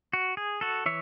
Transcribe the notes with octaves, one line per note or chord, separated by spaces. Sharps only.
F#4
G#4
F#4 A4
E3 C#5 E5